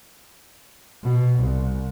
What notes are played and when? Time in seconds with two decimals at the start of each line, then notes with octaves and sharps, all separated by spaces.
1.03 B2
1.39 C2